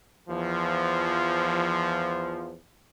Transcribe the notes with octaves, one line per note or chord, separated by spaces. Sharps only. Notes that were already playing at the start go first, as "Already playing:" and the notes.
E2 F3